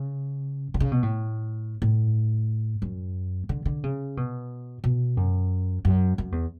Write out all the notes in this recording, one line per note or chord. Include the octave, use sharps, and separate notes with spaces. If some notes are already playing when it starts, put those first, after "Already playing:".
Already playing: C#3
D3
C#3
B2
A2
A2
F#2
D3
D3
C#3
B2
B2
F#2
F#2
F#2
E2